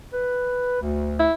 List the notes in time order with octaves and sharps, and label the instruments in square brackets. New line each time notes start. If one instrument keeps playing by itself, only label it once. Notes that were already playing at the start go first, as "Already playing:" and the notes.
[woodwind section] B4
D2
[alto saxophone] E4